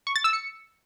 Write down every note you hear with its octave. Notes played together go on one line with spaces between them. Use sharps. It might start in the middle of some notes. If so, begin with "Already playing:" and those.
C#6
A6
E6
C#7